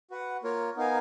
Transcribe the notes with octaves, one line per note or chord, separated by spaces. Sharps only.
F#4 B4 F#5
A#3 F4 A#4 C#5
B3 D#4 A#4 F5 G#5